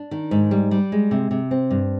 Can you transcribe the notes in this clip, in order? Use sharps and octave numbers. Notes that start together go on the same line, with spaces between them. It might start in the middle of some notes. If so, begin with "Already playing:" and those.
Already playing: D4
D#3
G#2
G3
G3
G#3
C3
C3
C4
G2